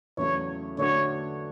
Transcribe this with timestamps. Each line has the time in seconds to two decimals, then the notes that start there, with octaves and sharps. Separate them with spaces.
0.17 E2 C#3 F#3 A3 E4 C#5
0.77 D3 A3 D4 F#4 C#5